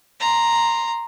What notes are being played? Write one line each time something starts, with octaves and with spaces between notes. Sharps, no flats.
A#5 C6